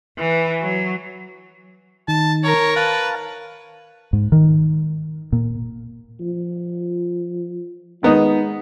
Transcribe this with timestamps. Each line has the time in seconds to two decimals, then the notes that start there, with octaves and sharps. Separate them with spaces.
0.18 E3
0.61 F#3
2.08 D#3 A5
2.44 A#4 C#5
2.76 B4 F5 A5
4.13 G#2
4.32 D#3
5.32 A#2
6.20 F3
8.03 D#3 G#3 B3 D#4